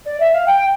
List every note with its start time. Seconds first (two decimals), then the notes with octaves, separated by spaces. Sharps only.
0.05 D5
0.19 E5
0.32 F5
0.46 G5